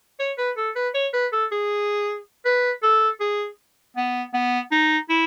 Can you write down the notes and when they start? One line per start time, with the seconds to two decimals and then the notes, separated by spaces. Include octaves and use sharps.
0.19 C#5
0.38 B4
0.57 A4
0.75 B4
0.94 C#5
1.13 B4
1.32 A4
1.51 G#4
2.45 B4
2.83 A4
3.20 G#4
3.96 B3
4.33 B3
4.71 D#4
5.09 E4